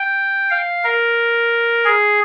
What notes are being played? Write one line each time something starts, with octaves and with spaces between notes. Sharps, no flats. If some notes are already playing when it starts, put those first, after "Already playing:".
Already playing: G5
F5
A#4
G#4